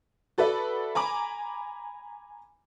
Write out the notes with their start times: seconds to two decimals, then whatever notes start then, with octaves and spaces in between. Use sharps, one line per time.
0.38 F#4 A4 B4 D5 E5
0.95 G#5 A#5 B5 D6